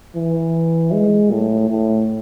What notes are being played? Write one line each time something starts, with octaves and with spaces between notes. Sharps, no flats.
E3
G#3
A2
A2